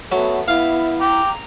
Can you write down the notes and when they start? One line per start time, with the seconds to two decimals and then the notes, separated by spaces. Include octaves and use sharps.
0.12 F#3 A3 B3
0.48 B3 E4 E5 F5
1.00 G4 A#5